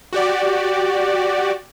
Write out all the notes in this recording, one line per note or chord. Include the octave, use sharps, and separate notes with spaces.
F#4 G4 D5